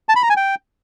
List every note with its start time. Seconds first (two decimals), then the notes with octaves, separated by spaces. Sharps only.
0.09 A5
0.16 B5
0.23 A#5
0.30 G#5
0.37 G5